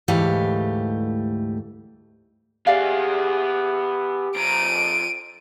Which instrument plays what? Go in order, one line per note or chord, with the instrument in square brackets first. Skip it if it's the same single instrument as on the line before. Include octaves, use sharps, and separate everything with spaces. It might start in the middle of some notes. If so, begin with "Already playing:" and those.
[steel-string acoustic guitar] D2 G#2 E3 A3 G4 F5
[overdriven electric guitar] B3 G#4 [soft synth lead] G4 [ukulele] D5 E5 F5
[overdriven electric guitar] F2 A#5 [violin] D7 D#7